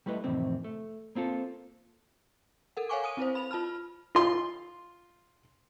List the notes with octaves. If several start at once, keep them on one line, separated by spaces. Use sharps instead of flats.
G3 A3 E4 B4 D#5
F2 A2 C3 D#3 E3 C4
A3
A#3 C4 F4 A4
A4 A#4 F#5
C#5 F5 F#5 G#5 C#6 D6
G#5 D#6 D#7
C4 E4 B4 C5
B5 F7
F4 A5 B5 F6
F4 C6